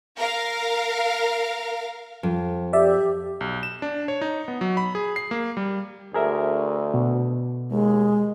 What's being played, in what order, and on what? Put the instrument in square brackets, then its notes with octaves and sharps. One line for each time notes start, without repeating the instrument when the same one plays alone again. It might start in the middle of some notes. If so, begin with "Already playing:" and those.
[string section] A#4 F5
[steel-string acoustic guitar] F2
[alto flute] G4 [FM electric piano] D5 E5
[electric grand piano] B1
E7
D4
C#5
D#4
B3
F#3
B5
G#4
C7
A#3
G3
[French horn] D2 [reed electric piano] G#4 A#4 E5
[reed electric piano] B2
[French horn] D#2 [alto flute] G#3